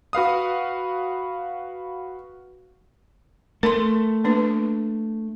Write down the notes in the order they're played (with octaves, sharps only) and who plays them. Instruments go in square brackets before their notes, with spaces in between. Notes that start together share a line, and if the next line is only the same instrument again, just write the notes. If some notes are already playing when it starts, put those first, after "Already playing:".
[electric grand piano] F#4 B4 F5 D#6
[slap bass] A3 [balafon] A#4 C6
[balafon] A#3 D4 B4